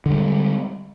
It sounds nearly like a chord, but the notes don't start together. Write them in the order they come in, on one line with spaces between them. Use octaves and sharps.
D3 G3 G#3